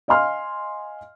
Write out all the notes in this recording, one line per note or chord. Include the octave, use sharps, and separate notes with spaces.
D#5 F5 G#5 C6 F6